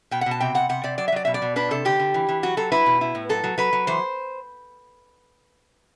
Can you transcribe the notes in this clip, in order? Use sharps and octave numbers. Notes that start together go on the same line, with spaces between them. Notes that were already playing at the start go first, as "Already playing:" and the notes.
B2 G5
F#5
B2 A5
C3 G5
C3 F#5
C3 F#5
C3 D5
F#3 D5
E5
F#3 D5
B2 E5
D5
B2
D4 B4
C3 A4
D3 G4
D3
E3
E3
F#3 F#4
F#3 A4
E4 B4
B2
E4
A2
F#3 A4
F#3
F#3 B4
F#3
E3 C5